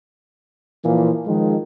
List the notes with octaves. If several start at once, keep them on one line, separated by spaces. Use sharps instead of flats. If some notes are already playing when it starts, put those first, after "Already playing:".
A#2 E3 F3 A#3
D#3 F3 G#3